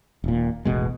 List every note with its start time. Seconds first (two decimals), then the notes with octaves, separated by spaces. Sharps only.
0.24 D#1 A#2
0.65 E1 A1 B2 G#3